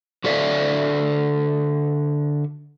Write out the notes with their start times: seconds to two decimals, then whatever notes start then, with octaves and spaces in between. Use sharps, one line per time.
0.24 D3 F#4 A4 D5 E5 F5